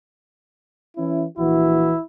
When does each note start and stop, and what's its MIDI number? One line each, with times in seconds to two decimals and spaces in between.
0.97 1.25 52
0.97 1.25 61
0.97 1.25 64
1.38 1.94 34
1.38 1.94 52
1.38 2.02 64
1.38 1.94 66